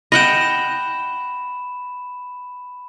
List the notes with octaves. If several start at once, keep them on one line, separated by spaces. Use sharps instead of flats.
D#5 F#5 G5 B5 E7